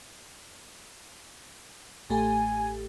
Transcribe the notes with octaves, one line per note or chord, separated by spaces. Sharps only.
A1 A3 G4 G#5